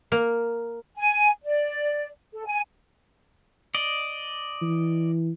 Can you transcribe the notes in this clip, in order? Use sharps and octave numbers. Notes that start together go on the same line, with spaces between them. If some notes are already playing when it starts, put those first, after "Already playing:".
A#3
G#5
D5
A4
G#5
D5 D#5
E3